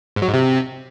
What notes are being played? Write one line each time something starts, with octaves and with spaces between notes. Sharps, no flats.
G#2
F#3
G#2
C3